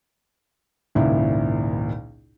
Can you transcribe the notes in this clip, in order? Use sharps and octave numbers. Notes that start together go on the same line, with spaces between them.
G#1 C#2 A#2 E4